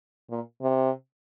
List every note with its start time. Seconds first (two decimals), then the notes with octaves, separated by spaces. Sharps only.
0.30 A#2
0.62 C3